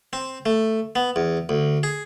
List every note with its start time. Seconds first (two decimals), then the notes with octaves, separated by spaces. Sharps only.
0.13 C4
0.46 A3
0.96 B3
1.16 E2
1.49 D2
1.83 G#4